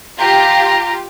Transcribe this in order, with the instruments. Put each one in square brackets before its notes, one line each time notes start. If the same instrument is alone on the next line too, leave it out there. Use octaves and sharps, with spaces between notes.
[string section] F4 G4 [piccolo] A#5